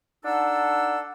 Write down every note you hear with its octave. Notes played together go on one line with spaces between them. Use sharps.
D4 D#4 A4 F#5 E6